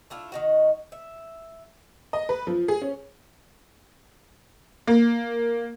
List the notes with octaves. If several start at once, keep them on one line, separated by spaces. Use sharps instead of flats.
A3 D4 E4 F4
D#3 D#4 F#4
E5
D#5
B4
F3
G#4
C#4
A#3